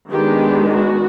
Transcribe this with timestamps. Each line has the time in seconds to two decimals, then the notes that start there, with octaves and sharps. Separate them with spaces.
0.11 D#3 G#3 B3 D4 G4
0.73 F#4